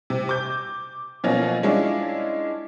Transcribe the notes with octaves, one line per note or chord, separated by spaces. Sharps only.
C3
D6 G6
B2 F3 F#3 A#3 C#4
G#3 C#4 D4 E4 F4